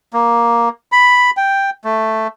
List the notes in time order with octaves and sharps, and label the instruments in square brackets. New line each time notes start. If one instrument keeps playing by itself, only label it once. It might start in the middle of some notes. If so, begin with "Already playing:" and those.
[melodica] A#3
B5
G5
A3